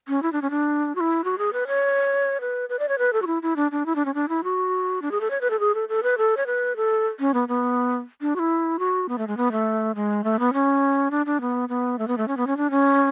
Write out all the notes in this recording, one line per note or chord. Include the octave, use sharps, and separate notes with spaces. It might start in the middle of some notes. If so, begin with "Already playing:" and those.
C#4
E4
D4
C#4
D4
F#4
E4
F#4
G#4
B4
C#5
B4
B4
D5
C#5
B4
A4
F#4
E4
E4
D4
D4
E4
D4
C#4
D4
E4
F#4
D4
G#4
A4
C#5
B4
A4
G#4
A4
A4
B4
A4
C#5
B4
A4
C#4
B3
B3
D4
F#4
E4
F#4
B3
A3
G#3
B3
A3
G#3
A3
B3
C#4
D4
D4
B3
B3
A3
B3
A3
C#4
B3
C#4
D4
C#4